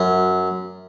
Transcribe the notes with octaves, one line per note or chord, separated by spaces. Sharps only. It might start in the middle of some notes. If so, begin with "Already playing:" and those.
Already playing: F#2